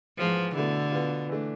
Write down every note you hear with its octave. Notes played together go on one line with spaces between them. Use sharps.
G#2 E3 F3 G#3 B3
B2 D3 A3 E4
B2 B3 F4
E3 A3 D4